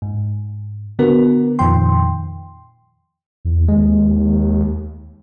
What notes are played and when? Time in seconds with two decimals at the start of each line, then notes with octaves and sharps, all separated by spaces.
0.02 G#2
0.99 D3 B3 F#4 A#4
1.59 F2 A#2 D#3 F3 G5 C6
3.45 E2
3.68 D#2 G#3